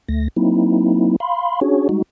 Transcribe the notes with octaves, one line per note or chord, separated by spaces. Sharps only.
D2 A3 A#6
F#3 A#3 C4 D#4 E4
F5 B5 C6
C#4 D4 F#4 G#4 C#5
G3 G#3 D#4 F#4